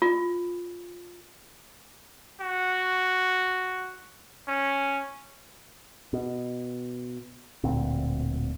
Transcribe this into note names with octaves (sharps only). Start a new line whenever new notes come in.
F4
F#4
C#4
B2
D1 D2 A#2 C4